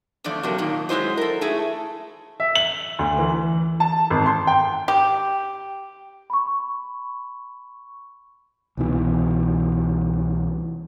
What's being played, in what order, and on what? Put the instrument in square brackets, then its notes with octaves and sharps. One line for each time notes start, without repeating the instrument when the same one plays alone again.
[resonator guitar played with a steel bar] E2 D3 F3 A3 D5
C3 F#3 A#3
F2 A#2 D#3
F#3 G#3 E4 C5 D#5
A4 A#4
A3 E4 G#4
[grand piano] E5
F#7
D2
E3
A5
G#1
C6
G5
[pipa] G4
[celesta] B5 C#6
[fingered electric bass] C2 B2 E3